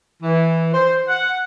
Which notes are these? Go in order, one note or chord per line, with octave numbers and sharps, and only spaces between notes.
E3
C5
F#5